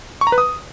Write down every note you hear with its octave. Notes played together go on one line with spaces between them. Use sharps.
C#6
A#5
B4
D#6